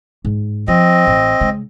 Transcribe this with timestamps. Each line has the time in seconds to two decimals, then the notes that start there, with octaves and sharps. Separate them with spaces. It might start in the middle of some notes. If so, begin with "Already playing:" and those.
0.25 G#2
0.68 F3 C4 D#5
1.07 A1
1.41 C#3 G#3